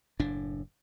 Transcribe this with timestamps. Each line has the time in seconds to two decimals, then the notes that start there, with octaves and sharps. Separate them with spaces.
0.19 F#1 A2 D4